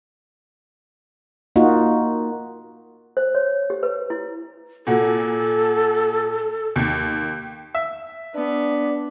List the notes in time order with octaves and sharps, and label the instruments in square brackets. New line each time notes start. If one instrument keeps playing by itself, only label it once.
[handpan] A#3 D#4 F4 F#4
[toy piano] C5
C#5
G4
B4
E4
[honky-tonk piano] A#2 F#4 [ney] A4
[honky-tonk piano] D#2
[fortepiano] E5
[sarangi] B3 [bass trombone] D4